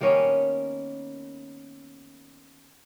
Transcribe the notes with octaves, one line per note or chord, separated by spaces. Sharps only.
D#3 A#3 B3 C#4